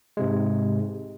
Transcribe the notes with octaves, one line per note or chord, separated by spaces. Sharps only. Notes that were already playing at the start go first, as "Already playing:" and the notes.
G#2 C3 G#3